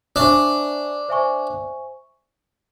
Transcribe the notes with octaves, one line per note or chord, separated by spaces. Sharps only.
D4 C5 E5 G#5 C#6
C5 E5 G#5 C#6